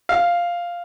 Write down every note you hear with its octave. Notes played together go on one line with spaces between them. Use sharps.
F5